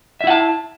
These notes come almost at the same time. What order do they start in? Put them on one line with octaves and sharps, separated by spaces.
E5 E4 F#5 A5